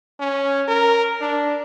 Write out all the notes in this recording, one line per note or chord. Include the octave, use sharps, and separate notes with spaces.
C#4
A#4
D4